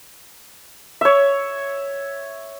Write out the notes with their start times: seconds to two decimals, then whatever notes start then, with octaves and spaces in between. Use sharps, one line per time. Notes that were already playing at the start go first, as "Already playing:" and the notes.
1.01 C#5 E5